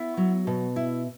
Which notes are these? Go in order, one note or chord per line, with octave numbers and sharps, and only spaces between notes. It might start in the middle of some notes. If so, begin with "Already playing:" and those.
Already playing: B3 E4 F#5
F#3
B2
E4